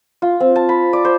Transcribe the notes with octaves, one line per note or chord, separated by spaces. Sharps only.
F4
C4
A5
B5
D5
C5